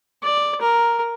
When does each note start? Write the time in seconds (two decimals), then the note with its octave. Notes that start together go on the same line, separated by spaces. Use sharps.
0.23 D5
0.61 A#4